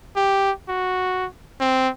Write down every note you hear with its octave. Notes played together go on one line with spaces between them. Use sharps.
G4
F#4
C4